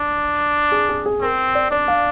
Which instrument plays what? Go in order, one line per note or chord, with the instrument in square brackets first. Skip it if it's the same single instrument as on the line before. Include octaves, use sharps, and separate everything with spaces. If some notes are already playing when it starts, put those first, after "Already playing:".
Already playing: [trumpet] D4
[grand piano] G#4
G#4
G#4
[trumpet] C4 [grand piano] A#4
[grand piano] D5
[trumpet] D4 [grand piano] D5
[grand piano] F5